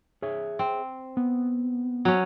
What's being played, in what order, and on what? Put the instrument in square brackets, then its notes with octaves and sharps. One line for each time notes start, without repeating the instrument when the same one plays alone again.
[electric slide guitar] G#4 C#5 E5
[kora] C4
[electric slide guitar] B3
[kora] F#3 C#4